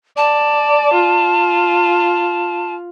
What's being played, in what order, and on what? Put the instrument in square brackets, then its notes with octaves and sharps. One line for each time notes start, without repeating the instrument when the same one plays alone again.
[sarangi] D5 [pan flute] A5
[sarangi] F4